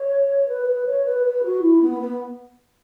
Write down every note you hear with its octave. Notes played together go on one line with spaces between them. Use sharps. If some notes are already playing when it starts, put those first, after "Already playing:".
Already playing: C#5
B4
B4
C#5
B4
B4
F#4
E4
B3
B3